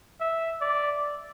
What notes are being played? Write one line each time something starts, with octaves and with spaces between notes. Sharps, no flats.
E5
D5